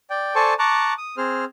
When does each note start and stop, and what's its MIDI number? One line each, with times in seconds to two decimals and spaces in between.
0.10 0.35 74
0.10 0.35 79
0.35 0.54 69
0.35 0.54 72
0.35 0.54 74
0.35 0.54 80
0.35 0.54 81
0.35 0.54 85
0.59 0.93 81
0.59 0.93 82
0.59 0.93 85
0.59 0.93 86
0.59 0.93 90
0.98 1.16 87
1.17 1.45 60
1.17 1.45 68
1.17 1.45 72
1.17 1.45 89